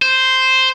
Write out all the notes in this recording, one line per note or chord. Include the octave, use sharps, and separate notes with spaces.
C5